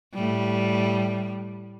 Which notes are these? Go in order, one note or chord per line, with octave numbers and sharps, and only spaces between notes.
A2 G3